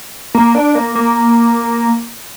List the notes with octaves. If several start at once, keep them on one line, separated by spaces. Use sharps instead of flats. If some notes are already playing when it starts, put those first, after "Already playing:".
A#3
D4
A#3
A#3